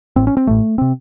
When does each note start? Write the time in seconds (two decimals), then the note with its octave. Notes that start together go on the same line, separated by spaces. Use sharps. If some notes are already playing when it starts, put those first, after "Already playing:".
0.16 A1 A2 C4
0.27 C#4
0.37 C4
0.47 A1 A2 A3
0.78 C3 C4